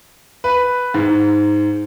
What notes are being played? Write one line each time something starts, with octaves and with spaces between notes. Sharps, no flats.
B4
G#2